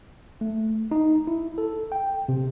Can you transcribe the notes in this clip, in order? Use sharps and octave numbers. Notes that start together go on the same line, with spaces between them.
A3
D#4
E4
A4
G5
C3